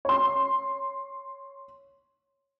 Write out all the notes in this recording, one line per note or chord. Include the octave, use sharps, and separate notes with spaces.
C#5 C6